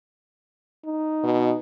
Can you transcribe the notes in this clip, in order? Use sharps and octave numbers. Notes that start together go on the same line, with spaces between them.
D#4
B2